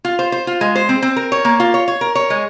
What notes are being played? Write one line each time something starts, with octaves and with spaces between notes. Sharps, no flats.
F4
C5
C5
F4
G#3
C5
C4
C4
A#4
C#5
A#3
F4
C#5
C#5
A#4
C#5
G#3